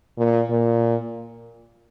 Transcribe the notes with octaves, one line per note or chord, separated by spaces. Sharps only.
A#2
A#2